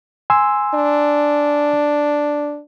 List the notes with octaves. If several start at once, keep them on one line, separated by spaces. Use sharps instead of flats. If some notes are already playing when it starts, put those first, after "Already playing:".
G#5 C6 E6
D4